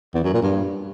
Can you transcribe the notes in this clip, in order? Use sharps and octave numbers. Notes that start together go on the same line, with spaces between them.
E2
F#2
A#2
G2